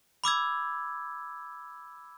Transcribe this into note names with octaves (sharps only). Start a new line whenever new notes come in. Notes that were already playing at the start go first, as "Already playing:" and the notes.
B5 D6 E6 G#6